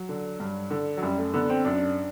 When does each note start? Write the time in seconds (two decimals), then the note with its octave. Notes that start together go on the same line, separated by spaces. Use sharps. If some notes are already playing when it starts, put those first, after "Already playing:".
Already playing: F#3
0.09 D3
0.40 G2
0.71 D3
0.97 F#3
1.02 F#2 G3
1.18 A3
1.34 D3 B3
1.50 C4
1.65 F#2 D4